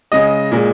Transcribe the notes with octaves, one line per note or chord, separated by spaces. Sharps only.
C#3 G#3 D#5
A#2 G#3